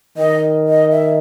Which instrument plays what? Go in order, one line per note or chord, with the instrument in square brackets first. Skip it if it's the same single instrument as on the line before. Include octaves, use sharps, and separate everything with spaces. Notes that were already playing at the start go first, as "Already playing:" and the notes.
[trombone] D#3 [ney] D#5
[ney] D#5
E5